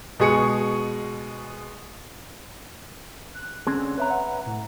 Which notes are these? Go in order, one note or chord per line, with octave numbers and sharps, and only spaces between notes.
B2 G#3 G#4 C#6 C#7
F#6
D3 C4 C#4 G#4
B4 C#5 E5 A#5
F#5
A2